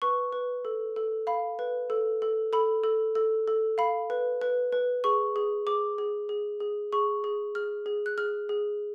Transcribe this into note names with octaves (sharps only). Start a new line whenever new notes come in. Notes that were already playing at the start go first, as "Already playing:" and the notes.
B4 C#6
B4
A4
A4
F5 B5
B4
A4
A4
A4 B5
A4
A4
A4
F5 B5
B4
B4
B4
G#4 C#6
G#4
G#4 D6
G#4
G#4
G#4
G#4 C#6
G#4
G#4 F6
G#4
F#6
G#4 F6
G#4